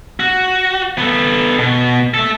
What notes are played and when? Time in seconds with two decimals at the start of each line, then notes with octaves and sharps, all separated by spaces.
0.20 F#4
0.98 B3 A4
1.59 B2
2.14 A4 E5